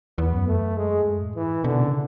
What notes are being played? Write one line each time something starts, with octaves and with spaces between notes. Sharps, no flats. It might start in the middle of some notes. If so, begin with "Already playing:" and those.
E2 B3
F#2
A3
G#3
E2
F#2
A2
G#2 E3
A2
B2 D3
C#3